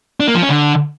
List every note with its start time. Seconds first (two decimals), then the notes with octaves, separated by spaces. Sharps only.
0.20 D4
0.28 A#3
0.35 F3
0.42 C#4
0.50 D3